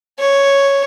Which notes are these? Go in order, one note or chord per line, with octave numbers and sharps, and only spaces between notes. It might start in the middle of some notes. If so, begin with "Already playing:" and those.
C#5